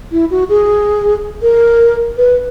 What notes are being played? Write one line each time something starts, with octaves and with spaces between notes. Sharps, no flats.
E4
F#4
G#4
A#4
B4